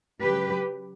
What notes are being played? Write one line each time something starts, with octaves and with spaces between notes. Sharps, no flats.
C#3 F#3 G4 B4